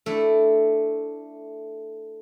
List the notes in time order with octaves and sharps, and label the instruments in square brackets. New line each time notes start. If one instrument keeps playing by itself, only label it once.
[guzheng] A3 D4 E4